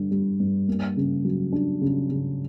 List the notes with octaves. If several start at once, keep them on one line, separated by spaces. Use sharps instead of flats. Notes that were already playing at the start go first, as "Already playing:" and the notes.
Already playing: G2 D3 G3
G3
G2
A#3
C#3
F#3
D4
C#3
C#3